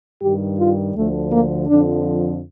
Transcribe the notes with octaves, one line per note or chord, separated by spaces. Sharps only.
G2 D#3 G3 G4
F4
D2 D3 F3 A3
A#3
F2 D3 F3 D4